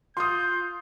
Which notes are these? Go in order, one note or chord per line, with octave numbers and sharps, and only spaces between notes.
F4 C6 D#6 G6